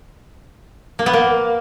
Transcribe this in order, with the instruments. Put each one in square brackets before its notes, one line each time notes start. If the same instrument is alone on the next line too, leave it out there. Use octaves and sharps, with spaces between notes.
[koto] A#3
B3
A#3